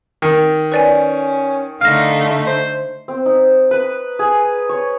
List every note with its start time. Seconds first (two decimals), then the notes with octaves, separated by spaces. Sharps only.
0.22 D#3
0.72 C#4 B4 D5 G#5
1.81 D3 A3 D#4 F5 F6 A#6
2.47 C5
3.08 C4
3.26 D#4
3.71 B4
4.19 G#4
4.69 C#5